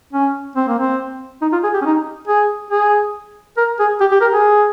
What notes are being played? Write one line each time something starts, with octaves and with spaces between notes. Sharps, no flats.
C#4
C4
A#3
C4
D#4
F4
G#4
G4
C#4
D#4
G#4
G#4
A#4
G#4
G4
G4
A#4
G#4